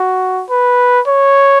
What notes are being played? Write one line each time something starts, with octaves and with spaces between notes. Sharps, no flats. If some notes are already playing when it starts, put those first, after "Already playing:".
Already playing: F#4
B4
C#5